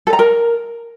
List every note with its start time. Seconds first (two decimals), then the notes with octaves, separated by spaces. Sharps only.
0.07 A4
0.13 A#5
0.19 A#4